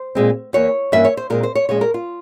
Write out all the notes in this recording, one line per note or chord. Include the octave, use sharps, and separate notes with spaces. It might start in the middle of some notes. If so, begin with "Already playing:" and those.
Already playing: C5
A#2 G#3 C4
E2 E3 A#3 C#5
G2 E3 A#3 C#4 E5
C#5
C5
A#2 G#3 C4 A#4
C5
C#5
A#2 F3 G#3 C#4 C#5
A#4
F4